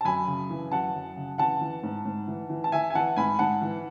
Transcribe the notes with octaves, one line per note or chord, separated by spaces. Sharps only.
A5
F#2 G#5 B5
C#3
E3
F#2 F#5 A5
F#2
C#3
E3 F#5 A5
E3
G#2
G#2
E3
E3
A5
E3 E5 G#5
G#5
E3 F#5 A5
G#2 G#5 B5
G#2 F#5 A5
E3